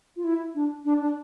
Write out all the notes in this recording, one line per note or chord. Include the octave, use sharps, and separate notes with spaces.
F4
E4
D4
D4
D4